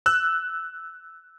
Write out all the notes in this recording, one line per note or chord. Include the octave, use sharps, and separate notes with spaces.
E6 F#6